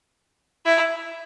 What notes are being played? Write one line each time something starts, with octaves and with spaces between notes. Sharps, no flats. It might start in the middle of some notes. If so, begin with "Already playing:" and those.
E4